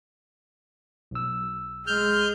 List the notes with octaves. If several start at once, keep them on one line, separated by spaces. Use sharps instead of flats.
B1 E6
G#3 F6 G6